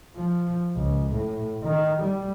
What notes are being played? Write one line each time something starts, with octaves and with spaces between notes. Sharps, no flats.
F3
C#2
A2
D#3
G3